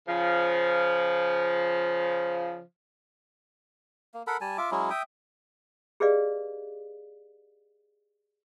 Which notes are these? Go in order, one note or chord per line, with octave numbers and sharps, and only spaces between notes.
C#3 F3
A#3
A4 A#4 F#5 B5
G3 G#5 A5
F4 E5 D6
F#3 G#3 C#4 E4
E5 G5 D#6
G4 G#4 B4 D5 D#5 F5